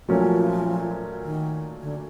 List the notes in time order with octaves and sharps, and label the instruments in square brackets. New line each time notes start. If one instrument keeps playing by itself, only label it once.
[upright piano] A#2 F#3 A3 C#4 [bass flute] F3
[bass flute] D#3
D3